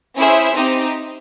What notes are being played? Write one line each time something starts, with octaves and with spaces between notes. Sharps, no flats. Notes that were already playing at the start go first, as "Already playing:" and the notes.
C#4 E4 G#4 C5 E5
C4 D#4 G4